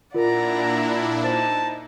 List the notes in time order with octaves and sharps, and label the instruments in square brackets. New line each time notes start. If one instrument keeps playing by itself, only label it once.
[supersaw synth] A#2 D4 E4 [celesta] F4 A#4 [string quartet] D5 F#5 A#5
[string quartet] D#4 [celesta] C5 [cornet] A5